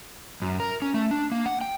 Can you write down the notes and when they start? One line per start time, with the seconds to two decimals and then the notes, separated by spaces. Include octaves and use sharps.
0.42 F#2
0.60 A#4
0.82 C#4
0.94 A3
1.11 D4
1.32 A#3
1.46 F#5
1.61 G5